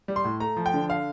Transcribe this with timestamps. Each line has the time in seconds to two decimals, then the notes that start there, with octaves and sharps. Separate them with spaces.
0.08 G3
0.16 C6
0.24 A2
0.40 A3 A#5
0.57 F3
0.66 G5
0.74 D3
0.90 F5